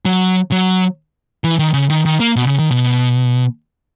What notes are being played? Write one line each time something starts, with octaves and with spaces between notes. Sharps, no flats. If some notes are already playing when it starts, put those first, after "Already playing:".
F#3
F#3
E3
D#3
C#3
D#3
D#3
A#3
B2
C#3
D#3
B2